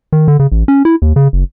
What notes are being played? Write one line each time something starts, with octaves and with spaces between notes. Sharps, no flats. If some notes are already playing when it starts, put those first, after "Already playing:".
D#3
D3
C#3
A1
C#4
E4
D#2
C#3
F#1